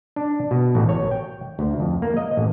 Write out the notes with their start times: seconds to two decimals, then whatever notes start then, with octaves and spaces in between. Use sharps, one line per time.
0.16 D4
0.51 B2
0.75 A1
0.89 C#5
1.11 G5
1.59 D2
1.80 F2
2.02 A#3
2.17 D#5
2.37 A1